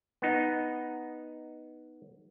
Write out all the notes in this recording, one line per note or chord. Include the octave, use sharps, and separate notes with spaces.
B3 D#4